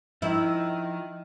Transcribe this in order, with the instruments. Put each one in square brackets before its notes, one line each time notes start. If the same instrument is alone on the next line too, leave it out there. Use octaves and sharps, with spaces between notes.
[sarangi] D#3 [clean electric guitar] F3 [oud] E4